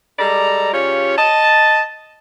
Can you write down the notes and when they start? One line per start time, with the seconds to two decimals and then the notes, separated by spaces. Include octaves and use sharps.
0.19 G3 G#3 A4 D5 A#5
0.73 C#3 C#4 F4 G4 C#5
1.17 D#5 A5